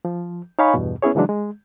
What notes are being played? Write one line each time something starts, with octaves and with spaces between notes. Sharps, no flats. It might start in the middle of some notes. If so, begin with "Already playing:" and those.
F3
D#4 C#5 F5 G#5 B5 C#6
E2 G2 B2
B3 C#4 E4 G#4 C#5
C#3 E3 F#3 G#3 D4
G#3